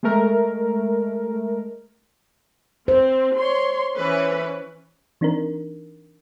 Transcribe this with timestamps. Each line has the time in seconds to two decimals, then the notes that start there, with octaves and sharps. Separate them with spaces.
0.03 G#3 A3 A#4
2.88 C4 C5
3.35 C#5 C6
3.96 E3 C#4 B4
5.21 E3 C4 D4 D#4 A#4